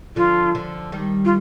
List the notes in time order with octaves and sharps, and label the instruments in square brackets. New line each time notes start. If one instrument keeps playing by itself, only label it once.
[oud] D3 F3 [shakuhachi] F4
[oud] D3 F3
D#3 G3
[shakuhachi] F4